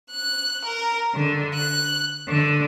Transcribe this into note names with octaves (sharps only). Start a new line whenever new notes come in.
F#6
A#4
D3
F#6
D3